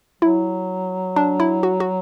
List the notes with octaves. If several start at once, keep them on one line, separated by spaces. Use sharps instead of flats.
F#3 E4
D4
E4
F#4
F#4